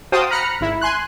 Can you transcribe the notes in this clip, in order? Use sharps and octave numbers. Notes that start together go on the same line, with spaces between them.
F#4 C5 F5 G5 A5 D#6
A#5 B5 F6 F#6 A#6 C#7
G#1 E4
G#5 C6 F#6